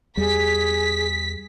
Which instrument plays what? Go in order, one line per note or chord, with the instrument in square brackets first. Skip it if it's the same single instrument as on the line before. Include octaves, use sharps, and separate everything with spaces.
[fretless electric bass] E2 G3 [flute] G#4 [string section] B6